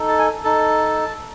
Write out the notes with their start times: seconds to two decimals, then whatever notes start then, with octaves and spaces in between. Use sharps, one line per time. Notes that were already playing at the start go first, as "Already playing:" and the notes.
Already playing: D#4 A4
0.08 A5
0.19 G#5
0.44 D#4 A4 A5